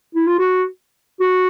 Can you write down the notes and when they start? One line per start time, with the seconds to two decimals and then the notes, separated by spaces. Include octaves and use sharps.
0.15 E4
0.27 F4
0.39 F#4
1.20 F#4